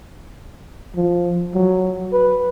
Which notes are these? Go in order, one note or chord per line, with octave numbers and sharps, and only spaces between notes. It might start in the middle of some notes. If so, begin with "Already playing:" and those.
F3
F#3
B4